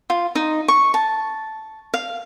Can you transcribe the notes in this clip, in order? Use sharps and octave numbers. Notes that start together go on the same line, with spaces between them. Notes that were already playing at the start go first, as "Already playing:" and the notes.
F4
D#4
C#6
A5
F5